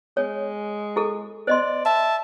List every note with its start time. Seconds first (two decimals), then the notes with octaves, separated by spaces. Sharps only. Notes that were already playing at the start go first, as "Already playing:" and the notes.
0.17 G#3 C#5
0.96 E4 G#4 A4
1.47 C5 D5 D#5 C6
1.86 E5 A5